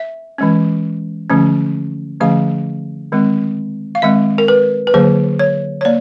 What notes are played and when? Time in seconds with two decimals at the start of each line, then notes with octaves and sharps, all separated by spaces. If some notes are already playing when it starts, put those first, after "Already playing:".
Already playing: E5
0.38 E3 G#3 C#4
1.30 D3 F3 A3 C#4
2.20 D3 F3 A3 C#4 F5
3.12 D#3 G#3 C4
3.95 F5
4.02 D#3 G#3 C4 E5
4.38 A#4
4.48 B4
4.87 B4
4.94 D3 F#3 A#3 C5
5.39 C#5
5.81 C#5
5.85 A#3 D5